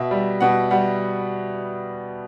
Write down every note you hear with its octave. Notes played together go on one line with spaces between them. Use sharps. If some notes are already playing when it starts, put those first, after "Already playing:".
Already playing: B2 E5
G3
B2 F#5
G3 F#5